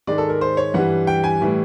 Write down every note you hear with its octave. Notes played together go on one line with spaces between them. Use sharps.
G#2 D#3 G#3 D5
A4
A#4
C5
C#5
G2 E3 G3 F#5
G5
G#5
A2 E3 G3